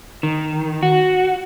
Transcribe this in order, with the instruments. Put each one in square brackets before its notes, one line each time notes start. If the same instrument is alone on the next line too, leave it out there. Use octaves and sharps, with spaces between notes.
[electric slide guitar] D#3
F#4